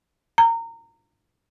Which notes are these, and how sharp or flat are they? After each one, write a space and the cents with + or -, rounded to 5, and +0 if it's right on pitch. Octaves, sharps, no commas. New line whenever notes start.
A#5 -25